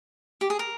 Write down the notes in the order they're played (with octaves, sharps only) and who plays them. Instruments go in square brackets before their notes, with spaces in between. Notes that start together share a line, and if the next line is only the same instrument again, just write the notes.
[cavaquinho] G4
G#4
A#4